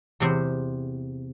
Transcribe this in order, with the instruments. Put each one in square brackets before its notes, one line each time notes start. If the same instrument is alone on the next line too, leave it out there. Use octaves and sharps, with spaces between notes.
[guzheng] E2 C3 C5